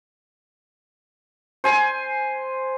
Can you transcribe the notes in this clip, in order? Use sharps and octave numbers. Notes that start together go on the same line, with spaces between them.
C5 G#5 C6